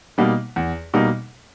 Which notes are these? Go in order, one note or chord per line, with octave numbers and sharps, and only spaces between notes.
B2 G3 A#3 D#4
E2
B2 G3 A#3 D#4